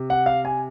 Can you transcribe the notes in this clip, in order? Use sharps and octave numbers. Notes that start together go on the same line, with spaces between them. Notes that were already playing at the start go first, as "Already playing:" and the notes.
Already playing: C3
F#5
F5
G#5